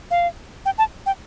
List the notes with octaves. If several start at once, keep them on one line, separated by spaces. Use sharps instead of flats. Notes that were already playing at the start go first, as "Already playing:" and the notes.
F5
G5
A5
G5